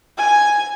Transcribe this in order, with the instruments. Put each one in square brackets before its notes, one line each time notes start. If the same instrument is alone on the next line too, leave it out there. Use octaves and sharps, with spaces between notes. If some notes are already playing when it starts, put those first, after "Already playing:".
[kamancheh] G#5